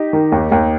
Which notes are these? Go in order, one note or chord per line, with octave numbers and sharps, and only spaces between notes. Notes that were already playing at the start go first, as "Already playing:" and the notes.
Already playing: D#4 G4
D#3
D#2
D#2